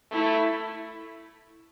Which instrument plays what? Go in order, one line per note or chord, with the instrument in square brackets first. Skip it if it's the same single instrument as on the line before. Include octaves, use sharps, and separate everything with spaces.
[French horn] A3 [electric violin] E4